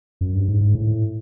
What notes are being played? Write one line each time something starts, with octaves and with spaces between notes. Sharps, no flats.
F#2
G2
G#2
G#2
A2